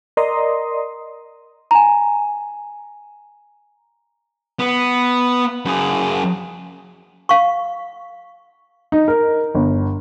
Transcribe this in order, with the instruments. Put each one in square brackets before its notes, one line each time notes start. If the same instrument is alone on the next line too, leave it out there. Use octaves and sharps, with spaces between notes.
[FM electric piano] A#4 D5 D#5 A#5 C6 D#6
[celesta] G#5 A#5
[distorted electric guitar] B3
F#2 G#4
[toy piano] F5 C#6
[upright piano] D#4
A#4
G1